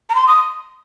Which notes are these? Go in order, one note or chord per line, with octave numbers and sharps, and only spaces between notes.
A#5
C6
D#6